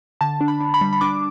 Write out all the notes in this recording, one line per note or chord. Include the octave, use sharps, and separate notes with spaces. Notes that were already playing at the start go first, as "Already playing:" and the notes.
D3 A5
D4
B5
D4
B5
G3
B5
D4 D6